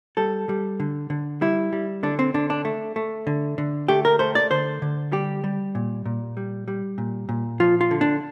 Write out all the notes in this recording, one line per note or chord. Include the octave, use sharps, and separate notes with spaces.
G3 A4
G3
D3
D3
G3 E4
G3
D3 D4
C4
D3 D4
D4
A3
A3
D3
D3
A3 G4
A#4
A3 C5
D5
D3 C5
D3
G3 G4
G3
A#2
A#2
G3
G3
A#2
A#2
F3 F4
F4
D3
D4